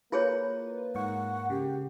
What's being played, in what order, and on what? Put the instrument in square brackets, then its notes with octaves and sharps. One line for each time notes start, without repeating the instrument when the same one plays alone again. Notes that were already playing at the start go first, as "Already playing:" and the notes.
[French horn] A#3 [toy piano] E4 G#4 C#5 [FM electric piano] F4 B4
[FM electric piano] G#2 C#6 [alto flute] F#5
[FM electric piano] C#3 [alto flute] G4